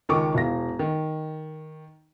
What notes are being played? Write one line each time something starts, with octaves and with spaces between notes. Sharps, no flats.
C#2 D#3 A#4 C#6 D6
E1 F5 A#6
D#3